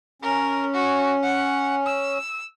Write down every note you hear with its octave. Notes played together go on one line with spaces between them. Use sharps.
C#4 A#4
F#4
F#5
E6